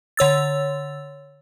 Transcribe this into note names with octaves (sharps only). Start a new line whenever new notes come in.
D3 C#5 E6 A6